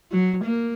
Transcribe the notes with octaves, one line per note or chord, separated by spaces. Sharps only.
F#3
A#3